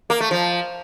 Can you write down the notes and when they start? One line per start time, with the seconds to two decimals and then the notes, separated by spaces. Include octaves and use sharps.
0.10 A#3
0.20 A3
0.31 F3